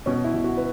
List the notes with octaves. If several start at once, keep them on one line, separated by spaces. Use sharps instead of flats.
B2 C#4
E4
B2
F#4
B4